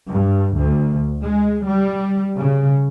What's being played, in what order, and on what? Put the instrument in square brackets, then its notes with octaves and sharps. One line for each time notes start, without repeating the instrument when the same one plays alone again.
[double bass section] G2
D2
G#3
G3
C#3